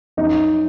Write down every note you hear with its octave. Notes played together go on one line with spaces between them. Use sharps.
F#2 D#4